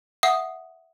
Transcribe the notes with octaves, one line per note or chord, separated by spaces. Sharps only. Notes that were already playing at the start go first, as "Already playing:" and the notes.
E5 F#5 D#6